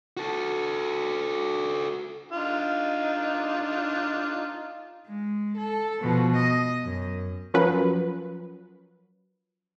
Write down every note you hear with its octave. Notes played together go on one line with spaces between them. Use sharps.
F#4 A4
D4 D#4 F4
G#3
A4
B2 F3
D#5
F#2
F3 F#3 C#4 F4 A#4 B4